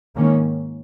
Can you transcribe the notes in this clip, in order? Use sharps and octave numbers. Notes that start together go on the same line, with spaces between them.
G#2 D#3 A#3 C#4